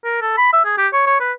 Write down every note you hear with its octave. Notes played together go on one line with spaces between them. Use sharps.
A#4
A4
B5
E5
G#4
G4
C#5
C#5
B4